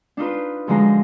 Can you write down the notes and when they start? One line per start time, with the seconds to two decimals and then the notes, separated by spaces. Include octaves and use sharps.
0.17 D4 D#4 F4 B4
0.67 F#2 D3 F3 G#3 A#5 C6